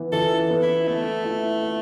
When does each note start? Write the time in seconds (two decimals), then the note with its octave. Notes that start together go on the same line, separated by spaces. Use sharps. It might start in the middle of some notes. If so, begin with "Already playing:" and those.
Already playing: E3 B3
0.12 E3 A4
0.50 B3
0.62 E4
0.87 A3 B3
1.24 E4
1.62 E4